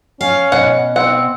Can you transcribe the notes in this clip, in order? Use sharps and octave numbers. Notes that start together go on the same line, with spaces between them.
C#4 F5
B2 F#5
C4 F#5